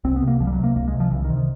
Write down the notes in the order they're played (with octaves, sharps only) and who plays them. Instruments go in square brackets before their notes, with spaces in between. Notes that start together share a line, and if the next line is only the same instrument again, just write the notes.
[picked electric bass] C2 C4
B3
C3
A#3
C2 F3
G3
F#3
C3
A#3
C2 A#3
G#3
C3
F3
C2 E3
D#3
C3
D#3